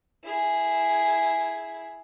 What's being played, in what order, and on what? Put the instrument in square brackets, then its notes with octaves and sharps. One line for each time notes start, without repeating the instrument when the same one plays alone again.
[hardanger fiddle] E4 G#4